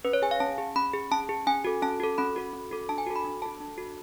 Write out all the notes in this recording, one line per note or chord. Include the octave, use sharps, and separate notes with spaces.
C#4 B4
C#5
G#4 G#5
F5
C#4 A5
G#4
C#4 B5
G#4
C#4 A5
G#4
C#4 G#5
F#4 A4
C#4 A5
F#4 A4
C#4 B5
F#4 A4
C#4
F#4 A4
D4 A5
G#5
F#4 A4
B5
D4
F#4 A4 A5
D4
F#4 A4